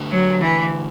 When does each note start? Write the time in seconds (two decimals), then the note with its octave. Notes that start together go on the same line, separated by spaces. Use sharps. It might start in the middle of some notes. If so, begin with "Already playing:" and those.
Already playing: D3 A3 D4 G4 B4
0.11 F#3
0.42 E3